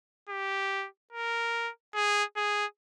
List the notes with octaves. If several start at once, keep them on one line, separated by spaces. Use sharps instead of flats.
G4
A#4
G#4
G#4